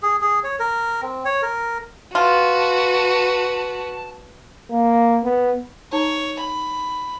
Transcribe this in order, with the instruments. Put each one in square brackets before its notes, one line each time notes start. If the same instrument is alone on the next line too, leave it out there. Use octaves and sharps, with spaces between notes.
[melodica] G#4
G#4
C#5
A#4
C4
C#5
A#4
[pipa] F4 [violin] F#4 B4 [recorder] A5
[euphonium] A#3
B3
[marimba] D#4 A5 A#5 [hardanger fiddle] C#5
[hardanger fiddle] B5